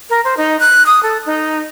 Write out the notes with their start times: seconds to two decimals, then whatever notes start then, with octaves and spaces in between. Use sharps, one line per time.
0.10 A#4
0.25 C5
0.37 D#4
0.60 F#6
0.86 D#6
1.03 A4
1.26 D#4